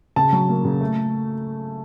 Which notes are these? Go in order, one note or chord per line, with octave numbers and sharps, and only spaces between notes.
C#3 A5
F#3
A#3
C#3
A3